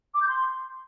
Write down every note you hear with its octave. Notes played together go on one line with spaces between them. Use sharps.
D6
G6
C6